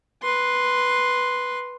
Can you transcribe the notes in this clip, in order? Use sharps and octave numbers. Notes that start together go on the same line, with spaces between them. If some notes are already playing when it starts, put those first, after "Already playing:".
B4 C6